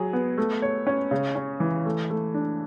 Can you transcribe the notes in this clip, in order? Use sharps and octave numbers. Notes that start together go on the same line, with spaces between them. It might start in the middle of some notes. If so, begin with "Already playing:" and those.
Already playing: F#3 G#4
B3
A3
C#5
C#4
C#3
C#4
E3
A3
A3
D4